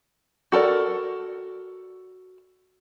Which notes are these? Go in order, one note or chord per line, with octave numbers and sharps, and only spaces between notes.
F#4 A4 A#4 D5